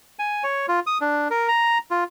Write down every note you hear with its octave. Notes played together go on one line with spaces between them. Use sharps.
G#5
C#5
F4
D#6
D4
A#4
A#5
F4